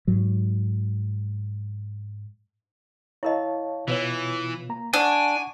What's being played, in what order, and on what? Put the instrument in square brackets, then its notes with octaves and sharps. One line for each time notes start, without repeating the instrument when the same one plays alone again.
[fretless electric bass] G#2 F#3
[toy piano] E4 A#4 D#5 [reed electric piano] C#5 F5 A5
[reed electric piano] B2 F4 [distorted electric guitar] E3 [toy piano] F#4 B4 C#5
[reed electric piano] A#3 A#5
[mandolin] D4 [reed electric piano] F#5 C#6 [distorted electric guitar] G#5